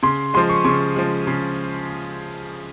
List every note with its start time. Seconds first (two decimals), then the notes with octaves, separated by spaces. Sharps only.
0.03 C#3 C6
0.34 F3 G#3 C6
0.49 C#6
0.65 C#3 C#6
0.96 F3 G#3
1.27 C#3